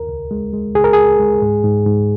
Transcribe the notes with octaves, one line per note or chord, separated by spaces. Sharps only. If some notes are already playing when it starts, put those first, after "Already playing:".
Already playing: D#2 A#4
C#2
G#3
G#3
C#2 G#4
A#4
C#2 G#4
G#3
G#2
G#2
G#2